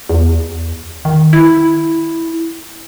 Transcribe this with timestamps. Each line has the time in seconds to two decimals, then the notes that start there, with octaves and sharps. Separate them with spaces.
0.09 E2
1.05 D#3
1.33 E4